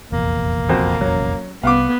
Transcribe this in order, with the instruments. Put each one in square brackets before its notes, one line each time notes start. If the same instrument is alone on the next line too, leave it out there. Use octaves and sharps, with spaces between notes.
[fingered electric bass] F1 A#1 E2 [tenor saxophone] A#3
[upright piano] F2 F#4 C5
F#3 C#4
[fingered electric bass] C2 [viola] B3 [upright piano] F5 F#5 D6